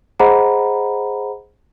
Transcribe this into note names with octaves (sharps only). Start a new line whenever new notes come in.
G#4 C5 D#5 F#5 A#5 B5